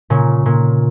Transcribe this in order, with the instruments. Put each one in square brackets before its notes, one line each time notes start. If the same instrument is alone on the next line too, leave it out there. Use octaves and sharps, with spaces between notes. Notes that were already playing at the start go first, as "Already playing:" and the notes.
[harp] A#2 C#3
A#2